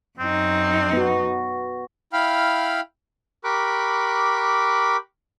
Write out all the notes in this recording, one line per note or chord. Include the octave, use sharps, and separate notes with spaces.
F#2 C4 D#4
B3 F#4
E4 F5 G5 B5 F6
G4 A#4 B5 C#6 D6 F#6